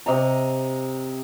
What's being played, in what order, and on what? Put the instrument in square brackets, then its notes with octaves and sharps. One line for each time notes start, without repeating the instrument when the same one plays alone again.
[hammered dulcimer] C3 D#5 A#5